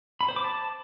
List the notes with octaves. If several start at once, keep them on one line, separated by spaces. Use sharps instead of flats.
B5
C5
D6
A5